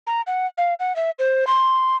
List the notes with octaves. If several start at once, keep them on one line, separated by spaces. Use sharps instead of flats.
A#5
F#5
F5
F#5
E5
C5
C6